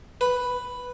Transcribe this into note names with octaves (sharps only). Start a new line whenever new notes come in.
B4